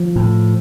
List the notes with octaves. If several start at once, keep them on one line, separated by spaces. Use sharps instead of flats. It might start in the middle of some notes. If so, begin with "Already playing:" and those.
Already playing: F3
A2